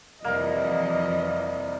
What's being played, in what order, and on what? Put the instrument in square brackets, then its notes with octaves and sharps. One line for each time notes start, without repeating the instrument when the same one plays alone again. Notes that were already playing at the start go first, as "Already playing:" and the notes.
[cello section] F2 E3 F3 [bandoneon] C3 G3 [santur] A#3 A#4 [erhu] D#5